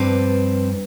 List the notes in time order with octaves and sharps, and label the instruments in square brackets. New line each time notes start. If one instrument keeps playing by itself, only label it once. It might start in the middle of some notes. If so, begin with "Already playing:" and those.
Already playing: [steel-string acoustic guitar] G2 F3 C4 B4 D5